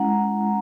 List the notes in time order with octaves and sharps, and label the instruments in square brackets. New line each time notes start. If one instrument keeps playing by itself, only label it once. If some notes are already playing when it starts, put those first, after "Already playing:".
Already playing: [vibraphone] G#3 C#4 E4 F#5 A#5